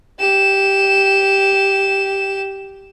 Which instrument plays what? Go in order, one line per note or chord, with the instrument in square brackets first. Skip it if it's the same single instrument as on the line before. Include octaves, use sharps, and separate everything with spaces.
[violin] G4 E7